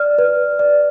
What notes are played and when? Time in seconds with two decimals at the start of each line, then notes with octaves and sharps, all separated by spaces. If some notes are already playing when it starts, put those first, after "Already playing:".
Already playing: D5 F6
0.18 B4
0.59 D5